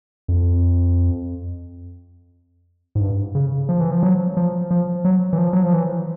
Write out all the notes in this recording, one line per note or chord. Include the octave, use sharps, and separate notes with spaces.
F2
G#2
G2
C#3
F3
E3
F3
F#3
F3
F3
F#3
E3
F3
F#3
F3
E3